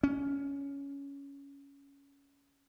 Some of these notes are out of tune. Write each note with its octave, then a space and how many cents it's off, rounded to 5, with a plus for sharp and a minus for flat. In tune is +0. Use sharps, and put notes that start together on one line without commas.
C#4 +15